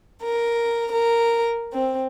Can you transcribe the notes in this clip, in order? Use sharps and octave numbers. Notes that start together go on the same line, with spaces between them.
A#4
A#4
C4